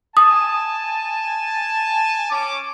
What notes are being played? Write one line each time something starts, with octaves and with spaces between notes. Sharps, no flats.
G#5 A5 D#6
C#4 D6